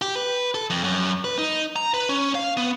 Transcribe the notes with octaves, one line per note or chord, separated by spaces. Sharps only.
G4
B4
A4
F2
F#2
B4
D#4
A#5
B4
C#4
F5
B3